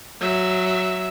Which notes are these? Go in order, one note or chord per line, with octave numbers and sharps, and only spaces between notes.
F#3 E5